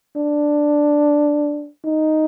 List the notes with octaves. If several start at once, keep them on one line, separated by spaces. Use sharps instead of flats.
D4
D#4